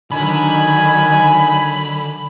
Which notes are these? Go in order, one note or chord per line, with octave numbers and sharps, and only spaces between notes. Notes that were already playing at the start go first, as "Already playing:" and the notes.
D3 D#3 F#3 D#4 G#5 B5